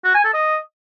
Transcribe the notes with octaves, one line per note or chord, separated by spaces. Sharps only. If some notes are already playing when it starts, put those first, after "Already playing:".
F#4
G#5
A4
D#5